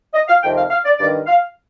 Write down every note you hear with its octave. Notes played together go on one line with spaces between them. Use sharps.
D#5
F5
F2 C3 D#3 G5
F5
F5
D5
G2 D#3 D5
F5